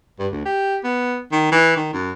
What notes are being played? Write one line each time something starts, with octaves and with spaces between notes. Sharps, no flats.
G2
D2
G4
B3
D#3
E3
D#3
F#2